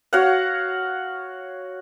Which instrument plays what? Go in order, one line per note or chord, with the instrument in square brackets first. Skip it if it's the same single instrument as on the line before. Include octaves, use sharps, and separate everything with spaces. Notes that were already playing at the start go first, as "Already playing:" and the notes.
[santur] F#4 C#5 F5 F#5